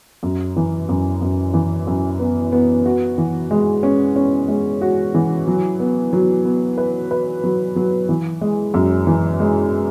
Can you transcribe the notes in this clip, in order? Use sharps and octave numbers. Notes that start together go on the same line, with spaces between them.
F#2
E3
F#2
F#2
E3
F#2
B3
B3
F#4
E3
G#3
C#4
C#4
G#3
F#4
E3
F#3
B3
F#3
B3
B4
B4
F#3
F#3
E3
G#3
F#2
E3
G#3